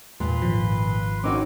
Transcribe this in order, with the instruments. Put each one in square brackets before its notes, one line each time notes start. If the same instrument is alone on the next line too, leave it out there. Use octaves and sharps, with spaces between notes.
[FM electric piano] E2 [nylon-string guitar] A#2 [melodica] B4 C6
[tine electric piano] G#1 [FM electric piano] F3
[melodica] A#3 C4 D6 [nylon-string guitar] C#4 D#4 F#4